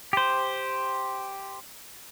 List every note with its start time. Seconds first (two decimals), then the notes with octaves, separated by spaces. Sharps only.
0.13 G4 C5